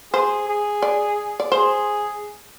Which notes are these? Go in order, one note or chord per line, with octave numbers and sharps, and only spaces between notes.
G#4 C5
G#4
D5
D5
G#4 C5